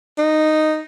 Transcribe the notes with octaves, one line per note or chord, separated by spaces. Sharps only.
D#4